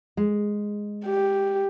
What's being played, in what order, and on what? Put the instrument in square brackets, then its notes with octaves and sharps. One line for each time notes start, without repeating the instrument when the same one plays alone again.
[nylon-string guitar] G#3
[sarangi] G4